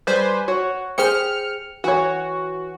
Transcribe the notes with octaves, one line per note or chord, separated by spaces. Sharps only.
G3 B4 C5 G#5
F#4 C#5
G4 G#4 C5 F6 C#7
E3 F#4 C#5